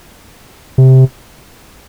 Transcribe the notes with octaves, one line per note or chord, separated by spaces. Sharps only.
C3